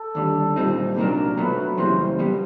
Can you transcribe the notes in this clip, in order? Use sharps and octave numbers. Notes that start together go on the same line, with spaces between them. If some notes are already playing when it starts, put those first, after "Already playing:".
Already playing: A4
D#2 D3 G3
B1 A#2 G3 C4 D#4
C2 A#2 F#3 A#3 D4 A#4
B2 F#3 A3 B4
F#2 C#3 E3 G3 A#3 C5
B2 G3 B3